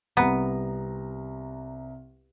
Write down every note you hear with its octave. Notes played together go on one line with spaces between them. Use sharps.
C2 B3 A#5